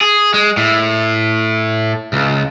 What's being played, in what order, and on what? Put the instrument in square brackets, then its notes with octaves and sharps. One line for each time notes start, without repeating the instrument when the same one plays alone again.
[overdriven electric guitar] G#4
G#3
A2
C#2